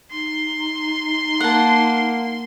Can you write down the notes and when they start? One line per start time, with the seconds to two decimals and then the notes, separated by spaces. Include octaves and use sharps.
0.11 D#4 C6
1.40 A#3 F#5 A5